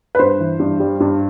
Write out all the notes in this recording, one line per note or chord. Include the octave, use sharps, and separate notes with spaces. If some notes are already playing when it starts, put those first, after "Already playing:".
B4
G2 C5
E3
G2
G3
G2